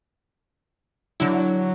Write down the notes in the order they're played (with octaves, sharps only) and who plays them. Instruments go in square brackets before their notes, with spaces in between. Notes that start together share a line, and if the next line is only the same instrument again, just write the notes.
[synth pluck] D3 E4 [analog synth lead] F#3